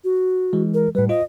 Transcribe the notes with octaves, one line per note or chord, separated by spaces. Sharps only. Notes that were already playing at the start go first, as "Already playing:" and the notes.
F#4
E3 G#3
A#4
A2 G3 B4
F4 C5 D#5